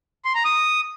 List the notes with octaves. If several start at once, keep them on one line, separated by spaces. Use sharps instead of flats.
C6
A#5
D#6